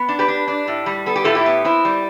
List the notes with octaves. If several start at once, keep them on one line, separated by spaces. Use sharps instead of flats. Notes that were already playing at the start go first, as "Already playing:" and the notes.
Already playing: B3
D4
G4 B4
D4
D4
A2
G3
B3 A4
G4
A2 F4 A4
E4 G4
B3
C4 E4
G3